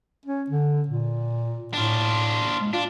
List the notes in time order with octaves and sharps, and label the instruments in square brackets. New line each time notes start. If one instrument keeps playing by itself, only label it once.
[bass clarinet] C#4
D3
A#2
[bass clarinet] A2 [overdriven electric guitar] D4 F4
[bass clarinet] G#3
[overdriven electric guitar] D4 [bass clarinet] F4